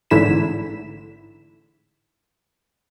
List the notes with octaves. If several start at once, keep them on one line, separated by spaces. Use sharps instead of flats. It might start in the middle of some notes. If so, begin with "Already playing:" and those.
A1 G#2 D3 E4 B6 E7